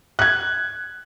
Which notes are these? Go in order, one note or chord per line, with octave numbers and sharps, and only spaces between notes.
F#6 G#6